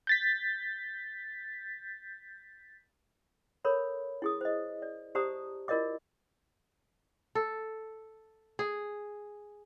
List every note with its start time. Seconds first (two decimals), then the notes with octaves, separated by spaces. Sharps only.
0.07 G6 A6 B6
3.65 A4 A#4 C#5 B5
4.22 E4 G#4 D#6
4.41 C5 D#5
4.82 D5
5.15 G4 C5 D5 A5 A#5 D#6
5.68 E4 F4 A#4 D5 D#5 D6
7.35 A4
8.59 G#4